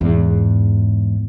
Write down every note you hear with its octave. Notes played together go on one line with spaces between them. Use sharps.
E2 G#2